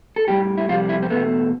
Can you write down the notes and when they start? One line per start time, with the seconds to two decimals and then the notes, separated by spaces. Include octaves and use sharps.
0.16 A4
0.27 A2 G3 G4
0.58 E4
0.69 F2 C3 G3 F4
0.89 E4
1.03 C4
1.10 E2 B2 A3 B3